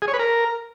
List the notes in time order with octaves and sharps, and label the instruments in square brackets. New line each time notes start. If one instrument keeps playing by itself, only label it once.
[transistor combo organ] G#4
C#5
B4
A#4